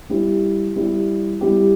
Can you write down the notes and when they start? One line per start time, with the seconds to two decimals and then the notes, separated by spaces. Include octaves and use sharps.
0.09 G3 E4 G4
0.76 G3 E4 G4
1.41 G3 E4 G4